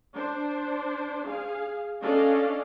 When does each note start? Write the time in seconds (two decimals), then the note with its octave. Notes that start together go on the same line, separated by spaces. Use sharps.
0.15 D4 C5
1.27 G#4 F5
2.02 C#4 D4 A4 D5 D#5 F5